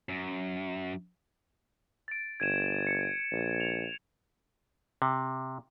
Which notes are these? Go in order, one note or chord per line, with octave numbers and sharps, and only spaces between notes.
F#2
A6 D7
G1 G#6 D#7 E7
C#7
A#1
F7
C3